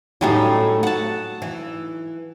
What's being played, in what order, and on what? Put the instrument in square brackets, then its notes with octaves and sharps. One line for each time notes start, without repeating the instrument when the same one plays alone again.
[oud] A2 A3 C#4 [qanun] F#3 G3 D#4
[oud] F#4 [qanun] F#5 A5
[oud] E3